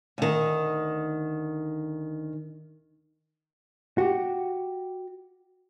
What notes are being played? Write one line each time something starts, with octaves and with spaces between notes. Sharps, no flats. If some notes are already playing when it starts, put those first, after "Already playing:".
D2 D#3
F#4 G4